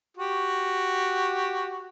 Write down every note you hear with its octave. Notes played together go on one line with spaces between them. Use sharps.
F#4 G4